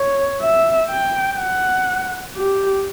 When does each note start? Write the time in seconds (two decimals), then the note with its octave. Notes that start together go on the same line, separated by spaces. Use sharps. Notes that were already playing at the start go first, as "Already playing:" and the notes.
Already playing: C#5
0.41 E5
0.89 G5
1.38 F#5
2.36 G4